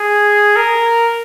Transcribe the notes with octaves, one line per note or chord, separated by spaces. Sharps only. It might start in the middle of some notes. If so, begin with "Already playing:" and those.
Already playing: G#4
A#4